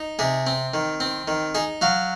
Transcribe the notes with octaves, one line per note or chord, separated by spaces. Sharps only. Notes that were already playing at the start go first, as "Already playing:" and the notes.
Already playing: D#4
C3 G#4
C4
D#3
C4
D#3
D#4 G#4
F#3 F5